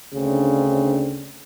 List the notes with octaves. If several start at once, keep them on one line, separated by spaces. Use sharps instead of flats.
D2 C#3 C4 D4